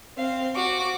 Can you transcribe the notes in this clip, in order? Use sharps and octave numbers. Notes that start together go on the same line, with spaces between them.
C4 F5
F#4 D6